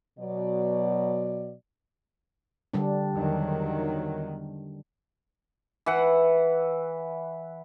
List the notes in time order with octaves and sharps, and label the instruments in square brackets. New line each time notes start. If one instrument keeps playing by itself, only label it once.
[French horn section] B2 F#3 D5
[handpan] D3 G3 D4
[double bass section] E2 D#3 F#3
[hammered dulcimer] E3 F#5